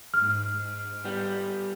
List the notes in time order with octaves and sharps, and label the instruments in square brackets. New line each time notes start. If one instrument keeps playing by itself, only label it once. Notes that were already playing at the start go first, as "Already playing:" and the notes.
[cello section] G#2 [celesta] F6
[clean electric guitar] G3 B3